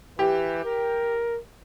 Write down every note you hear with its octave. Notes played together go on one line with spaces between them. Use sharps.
E3 G4
A#4